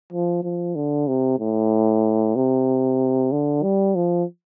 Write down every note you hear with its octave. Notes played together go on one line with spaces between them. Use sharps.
F3
F3
D3
C3
A2
C3
D3
G3
F3